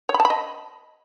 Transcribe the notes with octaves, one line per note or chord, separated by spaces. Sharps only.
C#5
B5
A5
B5
D#5